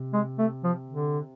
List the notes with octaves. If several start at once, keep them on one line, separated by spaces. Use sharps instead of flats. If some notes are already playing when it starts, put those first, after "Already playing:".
Already playing: C3
G#3
A3
F3
D3